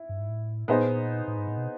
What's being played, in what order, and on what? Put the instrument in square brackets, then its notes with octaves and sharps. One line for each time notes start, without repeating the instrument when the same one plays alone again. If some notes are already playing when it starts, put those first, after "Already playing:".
Already playing: [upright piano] E4
[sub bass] G2
G#2
A2
[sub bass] A#2 [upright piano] B3 D#4 G#4 C5
[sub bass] A2
G#2
A2
B2